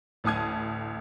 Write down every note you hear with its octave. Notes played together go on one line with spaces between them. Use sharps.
A1 D2 A5 D#6 G#6